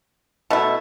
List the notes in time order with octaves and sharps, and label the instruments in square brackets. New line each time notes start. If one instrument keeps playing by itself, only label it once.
[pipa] B2 A3 E4